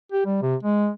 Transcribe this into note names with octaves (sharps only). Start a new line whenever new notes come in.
G4
G3
C3
G#3